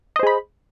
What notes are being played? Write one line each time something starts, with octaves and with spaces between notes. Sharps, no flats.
G#4 C5 D#5 B5